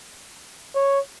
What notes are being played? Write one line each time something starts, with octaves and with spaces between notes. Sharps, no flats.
C#5